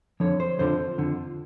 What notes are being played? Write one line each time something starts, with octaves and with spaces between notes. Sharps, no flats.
F2 D3 F3 C#5
C5
F2 D3 F3 C5
F2 D3 F3